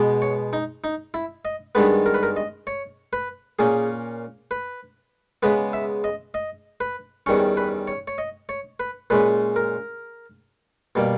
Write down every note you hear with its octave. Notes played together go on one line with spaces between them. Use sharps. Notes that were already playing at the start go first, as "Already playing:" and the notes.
Already playing: B2 G#3 B3
C#5
D#4
D#4
E4
D#5
G2 D#3 G#3 B3 B4
A#4
B4
A#4
D#5
C#5
B4
A#2 A#3 C#4 G#4
B4
C#3 G#3 B3 B4
E5
D#5
D#5
B4
E2 D#3 G3 C#4 C#5
B4
C#5
C#5
D#5
C#5
B4
A#2 G#3 C#4 B4
A#4
B2 G3 A#3